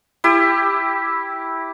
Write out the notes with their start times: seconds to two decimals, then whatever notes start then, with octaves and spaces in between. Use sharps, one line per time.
0.24 E4 G4